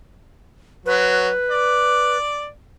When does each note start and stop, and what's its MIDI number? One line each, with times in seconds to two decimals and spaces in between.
0.86 1.29 54
0.86 2.17 71
1.50 2.47 74